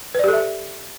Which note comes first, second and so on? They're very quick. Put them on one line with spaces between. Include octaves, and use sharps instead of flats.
B4 D5 G4 A4 E5